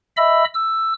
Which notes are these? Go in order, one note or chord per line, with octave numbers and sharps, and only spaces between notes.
D#5 E5 B5 E6
E6